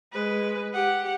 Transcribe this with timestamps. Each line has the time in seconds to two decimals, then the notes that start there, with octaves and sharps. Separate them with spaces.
0.12 G#3 B4
0.74 G4 F#5